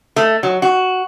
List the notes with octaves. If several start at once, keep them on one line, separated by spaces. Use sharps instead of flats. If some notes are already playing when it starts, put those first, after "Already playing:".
A3
F#3
F#4